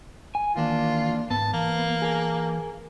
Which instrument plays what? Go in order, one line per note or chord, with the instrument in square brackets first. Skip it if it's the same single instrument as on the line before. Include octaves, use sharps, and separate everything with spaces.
[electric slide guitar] G#5
[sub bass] D#3 [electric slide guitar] E3 A#3 D4 [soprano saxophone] F4
[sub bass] G#2 [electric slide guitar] B3 [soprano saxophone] A5
[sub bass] E3 [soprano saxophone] A#3
[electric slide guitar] G#4 A#4